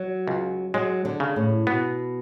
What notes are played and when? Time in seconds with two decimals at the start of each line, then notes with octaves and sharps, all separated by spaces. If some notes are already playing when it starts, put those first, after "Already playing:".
Already playing: F#3
0.28 C#2
0.74 F#3 G#3
1.05 D3
1.20 C#3
1.36 A2
1.67 B2 B3